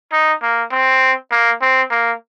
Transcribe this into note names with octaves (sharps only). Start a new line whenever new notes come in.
D#4
A#3
C4
A#3
C4
A#3